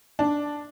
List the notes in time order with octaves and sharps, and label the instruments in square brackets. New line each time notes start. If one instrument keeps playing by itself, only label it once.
[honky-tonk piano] D4